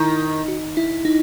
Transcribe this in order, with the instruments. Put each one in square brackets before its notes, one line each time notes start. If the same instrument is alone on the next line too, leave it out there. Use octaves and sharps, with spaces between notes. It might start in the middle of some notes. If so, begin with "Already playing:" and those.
Already playing: [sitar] D#3 [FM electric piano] E4
[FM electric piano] F#4
E4
D#4